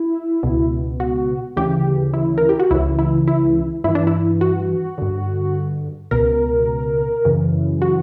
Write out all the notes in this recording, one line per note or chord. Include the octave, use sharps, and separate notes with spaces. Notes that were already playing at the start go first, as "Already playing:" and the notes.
Already playing: E4
C#2 B2
F#4
D2 C#3 E3 G4
E4
A#4
G4
F#4
C#2 C#3 E3 E4
E4
E4
G2 E3 E4
D4
E4
F#4
G2 D3
C#2 B2 A#4
F#2 C#3 E3
F#4